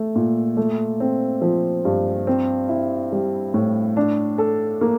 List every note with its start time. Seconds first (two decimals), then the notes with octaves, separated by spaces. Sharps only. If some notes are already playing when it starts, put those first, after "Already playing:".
Already playing: A3
0.16 A#2
0.57 A3
1.00 C4
1.42 F3
1.85 G2
2.27 C4
2.69 E4
3.12 G3
3.54 A2
3.97 D4
4.38 A4
4.81 A#3